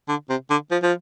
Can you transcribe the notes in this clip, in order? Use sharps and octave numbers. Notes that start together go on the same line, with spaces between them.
D3
C3
D3
F3
F3